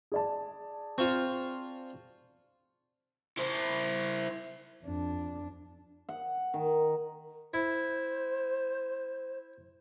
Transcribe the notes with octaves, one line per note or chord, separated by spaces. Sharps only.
G#4 D5 A5
C4 F4 C5 C#6
E4 C5
F2 D4
F#5
D#3
E4 C5